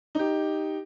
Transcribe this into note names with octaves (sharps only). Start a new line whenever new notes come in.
D#4 G4